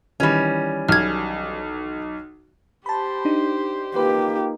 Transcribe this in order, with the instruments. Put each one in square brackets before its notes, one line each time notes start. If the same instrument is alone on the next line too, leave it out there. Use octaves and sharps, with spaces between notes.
[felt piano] D#3 E3 B5 [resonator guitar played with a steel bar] G3 C#4
[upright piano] B1 [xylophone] F6 G#6
[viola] G4 C5 [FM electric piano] A5 B5
[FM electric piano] D4 D#4
[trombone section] A#3 D#4 F4 [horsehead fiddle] G4 [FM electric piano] B4